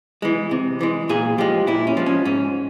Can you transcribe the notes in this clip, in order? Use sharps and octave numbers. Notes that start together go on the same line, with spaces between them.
E3 G#3
C3
E3 G#3
A#2 G#4
F3 G#3 G4
A#2 E4
C#4
F3 G#3
C#4
G#2 C#4